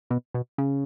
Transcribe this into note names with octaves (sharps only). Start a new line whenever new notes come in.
B2
B2
C#3